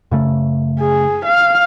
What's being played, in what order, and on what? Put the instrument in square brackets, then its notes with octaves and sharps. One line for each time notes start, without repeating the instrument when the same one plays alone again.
[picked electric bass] F#2 C#3 A3
[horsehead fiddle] G#4
F5